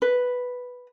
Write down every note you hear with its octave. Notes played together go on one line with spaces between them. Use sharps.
B4